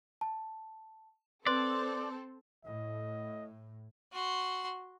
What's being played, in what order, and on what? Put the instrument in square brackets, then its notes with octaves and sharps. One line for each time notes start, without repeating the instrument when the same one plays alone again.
[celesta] A5
[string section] C4 A4 [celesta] B4 C6 F#6 [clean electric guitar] D5
[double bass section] A2 [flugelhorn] D#5
[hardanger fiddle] F#4 C6